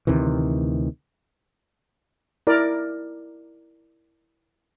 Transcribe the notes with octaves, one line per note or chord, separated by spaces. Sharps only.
D2 C3 D#3 E3
E4 A#4 D5